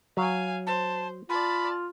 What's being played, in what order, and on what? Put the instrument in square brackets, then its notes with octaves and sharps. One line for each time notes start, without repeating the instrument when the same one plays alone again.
[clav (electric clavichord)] F#3 [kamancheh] F5 G#5
[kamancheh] C5 [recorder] A5
[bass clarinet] F4 [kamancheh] D5 A5 [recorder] B5